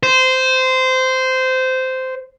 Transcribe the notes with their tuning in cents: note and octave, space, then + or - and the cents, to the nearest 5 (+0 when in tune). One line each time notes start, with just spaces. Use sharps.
C5 -15